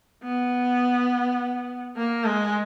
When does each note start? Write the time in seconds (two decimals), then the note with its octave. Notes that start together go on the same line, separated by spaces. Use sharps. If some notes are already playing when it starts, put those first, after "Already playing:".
0.23 B3
1.97 A#3
2.25 G#3